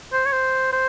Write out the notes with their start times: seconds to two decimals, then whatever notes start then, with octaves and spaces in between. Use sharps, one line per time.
0.12 C5
0.25 C#5
0.32 C5
0.73 C5